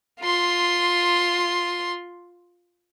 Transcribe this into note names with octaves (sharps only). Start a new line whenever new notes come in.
F4 C6